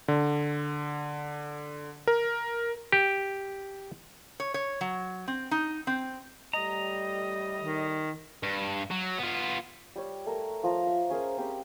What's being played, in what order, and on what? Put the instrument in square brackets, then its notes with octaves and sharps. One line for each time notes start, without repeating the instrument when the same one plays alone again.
[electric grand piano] D3
A#4
[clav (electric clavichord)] G4
[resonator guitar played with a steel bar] C#5
C#5
F#3
C4
D#4
C4
[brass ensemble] A2 G3 [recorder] D#5 [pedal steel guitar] A#5
[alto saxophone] D#3
[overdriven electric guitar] G2
F#3
B3 F4
[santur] G3 C#5
A3 A4 A#4
F3 A5 A#5
E5
C#4 G#4 A#4 C5
C4 G4 G5 B5